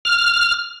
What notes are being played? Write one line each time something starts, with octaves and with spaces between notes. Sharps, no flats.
F6